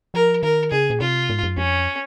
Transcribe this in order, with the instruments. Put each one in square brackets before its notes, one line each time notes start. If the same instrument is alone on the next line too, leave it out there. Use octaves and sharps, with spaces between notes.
[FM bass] F3 [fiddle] A#4
[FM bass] D#3 [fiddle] A#4
[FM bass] C#3 [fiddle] G#4
[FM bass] A#2
[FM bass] C3 [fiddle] F4
[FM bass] G#2
F#2
[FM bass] F2 [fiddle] C#4